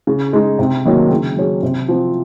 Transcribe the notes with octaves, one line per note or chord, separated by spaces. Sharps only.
C#3
G#3 D#4
C3
D#3 F#3 A#3 C#4
C#3
F#3 C#4 G#4
C3
F3 C4